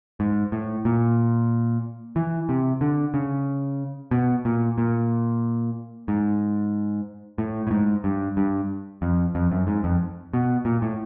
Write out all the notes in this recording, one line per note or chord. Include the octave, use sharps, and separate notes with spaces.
G#2
A2
A#2
E3
C3
D3
C#3
B2
A#2
A#2
G#2
A2
A2
G#2
G2
G2
F2
F2
F#2
G#2
F2
B2
A#2
A2